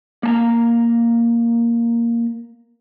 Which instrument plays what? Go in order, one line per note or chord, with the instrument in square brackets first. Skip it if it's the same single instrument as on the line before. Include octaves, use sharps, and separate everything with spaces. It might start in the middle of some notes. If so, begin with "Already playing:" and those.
[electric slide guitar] A#3 A5 A#5